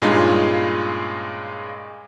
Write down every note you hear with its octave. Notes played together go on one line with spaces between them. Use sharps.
G2 A#2 G#3 C#4 D#4 F4